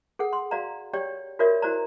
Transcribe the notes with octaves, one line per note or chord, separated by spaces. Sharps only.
G#4 A4 F#5
C6
F#4 D5 F5 A#5
G4 C#5 D5 G5
F4 F#4 A#4 C#5 D5 E5
E4 F#4 C5 D5 A#5